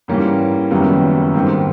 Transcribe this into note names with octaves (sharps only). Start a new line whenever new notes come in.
G#2 E3 G3 A#3 C#4
F#1 F#2 D#3 G3 B3
G#2 D#3 G3 C4